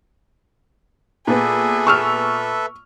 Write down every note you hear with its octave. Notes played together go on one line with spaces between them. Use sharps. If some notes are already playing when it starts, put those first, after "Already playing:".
A#2 B3 G#4 A4 B4 E5
C#6 E6 F6